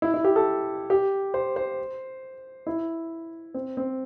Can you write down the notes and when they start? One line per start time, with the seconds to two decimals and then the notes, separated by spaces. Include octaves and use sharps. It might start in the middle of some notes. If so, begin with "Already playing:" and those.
0.02 E4
0.14 E4
0.24 G4
0.36 A4
0.90 G4
1.34 C5
1.56 C5
2.67 E4
3.54 C4
3.77 C4